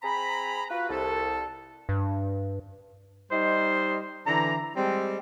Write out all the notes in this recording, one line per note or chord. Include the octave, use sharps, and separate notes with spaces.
C4 G#4 A#5 B5
F4 F#4 B4
C2 A4
G2
G3 D#4 C5 D#5
D3 E3 A#5
G3 G#3 C4